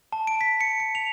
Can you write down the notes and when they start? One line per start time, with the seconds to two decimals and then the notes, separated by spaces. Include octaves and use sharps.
0.12 A5
0.27 D7
0.41 B6
0.61 C#7
0.80 C#7
0.95 F7